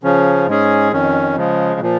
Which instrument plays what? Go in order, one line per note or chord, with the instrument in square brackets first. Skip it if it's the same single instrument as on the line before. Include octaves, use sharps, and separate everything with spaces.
[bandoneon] C#3 F3 C#4
G#2 G#3 C#4 G#4
F2 D#3 C#4
C#3 F3 G#3
A#2 F3